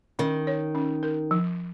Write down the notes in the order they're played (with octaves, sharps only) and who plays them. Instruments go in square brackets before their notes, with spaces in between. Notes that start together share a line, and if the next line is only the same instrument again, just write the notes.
[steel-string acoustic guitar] D#3 [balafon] C#4
[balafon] C#5
C#4
A#4
F3